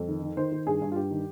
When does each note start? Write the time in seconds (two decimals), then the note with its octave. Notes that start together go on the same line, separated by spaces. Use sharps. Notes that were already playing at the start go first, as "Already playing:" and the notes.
Already playing: F2
0.08 D#3
0.22 D#3
0.37 D#3 C5
0.52 D#3
0.67 G2 G#4
0.81 G2
0.92 F4
0.96 G2 G4
1.11 D#3